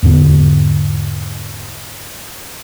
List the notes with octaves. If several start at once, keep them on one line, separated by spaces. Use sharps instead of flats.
E2 G#2 D3 B3